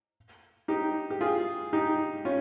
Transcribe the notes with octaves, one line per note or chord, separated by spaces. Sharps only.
D#4 G4
G4
F4 G#4
D#4 G4
C#4 F4